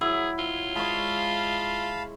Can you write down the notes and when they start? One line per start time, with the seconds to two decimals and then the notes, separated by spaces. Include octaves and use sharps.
0.01 F#3 E4 G#4
0.39 F4
0.75 G#3 C#5 F5 A5 B5